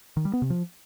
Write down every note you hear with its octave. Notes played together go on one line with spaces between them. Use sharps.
D#3
G3
B3
C3
F3